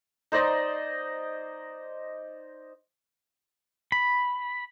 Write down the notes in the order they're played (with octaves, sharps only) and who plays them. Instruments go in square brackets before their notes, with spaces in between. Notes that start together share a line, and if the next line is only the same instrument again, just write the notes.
[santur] D#4 C5 D5 D#5
[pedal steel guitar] B5